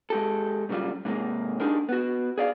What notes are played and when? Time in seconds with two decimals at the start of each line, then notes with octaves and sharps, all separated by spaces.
0.10 G#3 G4 A4
0.69 A#2 C#3 F#3 G3 F4
1.05 G#2 C3 D#3 G#3 A#3
1.60 D4 D#4 G4 G#4 A#4
1.89 B3 F#4
2.38 G#4 D5 F5